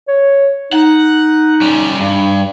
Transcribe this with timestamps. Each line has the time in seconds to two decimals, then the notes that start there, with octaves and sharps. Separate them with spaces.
0.08 C#5
0.73 D#4 F#5
1.61 G3 C#4
2.00 G2